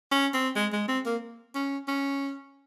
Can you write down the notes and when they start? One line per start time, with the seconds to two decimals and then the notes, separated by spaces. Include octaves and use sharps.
0.12 C#4
0.34 C4
0.56 G#3
0.73 G#3
0.88 C4
1.05 A#3
1.55 C#4
1.88 C#4